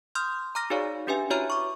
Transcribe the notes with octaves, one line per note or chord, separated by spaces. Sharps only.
C6 D#6 F6 G6
A#5 D6 F6 A#6
D#4 F#4 G#4 C#5 D5 F5
C#4 D4 G4 B4 E5 G#5
E4 F#4 C#5 E5 A#5 F6
C#6 D6